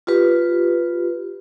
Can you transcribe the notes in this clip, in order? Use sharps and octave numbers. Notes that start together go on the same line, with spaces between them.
F4 G4 B4